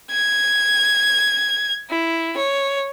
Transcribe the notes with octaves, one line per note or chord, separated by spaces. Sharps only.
G#6
E4
C#5